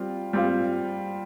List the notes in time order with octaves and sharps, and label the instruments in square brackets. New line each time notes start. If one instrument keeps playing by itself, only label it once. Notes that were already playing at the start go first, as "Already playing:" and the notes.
Already playing: [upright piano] G3 C4 F4
G3 C4 F4